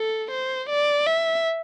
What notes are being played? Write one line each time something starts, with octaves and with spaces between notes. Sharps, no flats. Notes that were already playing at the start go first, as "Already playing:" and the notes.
Already playing: A4
C5
D5
E5